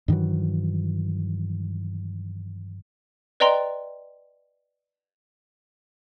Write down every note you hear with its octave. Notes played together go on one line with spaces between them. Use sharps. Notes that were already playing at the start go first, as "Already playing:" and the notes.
G2 D#3 E3 F#3
B4 D5 D#5 G5 A#5 C6